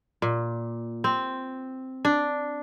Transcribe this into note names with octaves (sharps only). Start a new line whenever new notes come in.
A#2
C4
D4